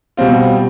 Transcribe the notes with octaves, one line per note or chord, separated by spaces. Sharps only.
B2 G3 C4 F4